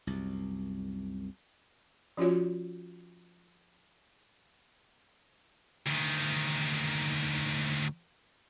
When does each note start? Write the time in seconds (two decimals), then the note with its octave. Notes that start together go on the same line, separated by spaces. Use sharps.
0.07 C2 F#2
2.17 F3 C#4 F4 F#4 C#5
5.86 D2 D#3